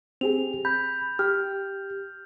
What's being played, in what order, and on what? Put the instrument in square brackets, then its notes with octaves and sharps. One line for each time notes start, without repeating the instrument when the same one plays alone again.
[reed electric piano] C4 G4 G#4 [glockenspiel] F7
[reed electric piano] B5 [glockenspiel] G6
[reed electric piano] G4 [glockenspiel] F6